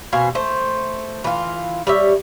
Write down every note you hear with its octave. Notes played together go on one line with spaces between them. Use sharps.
B2 C4 F5 G#5
A3 C5
E3 F4
G3 C#5 E5